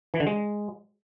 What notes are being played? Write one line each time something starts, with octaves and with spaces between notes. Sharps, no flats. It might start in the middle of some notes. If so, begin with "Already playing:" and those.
E3
D3
G#3